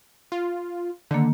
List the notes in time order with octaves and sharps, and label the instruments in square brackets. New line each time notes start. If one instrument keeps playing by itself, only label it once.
[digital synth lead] F4
[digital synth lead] D3 [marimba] D#3 A#3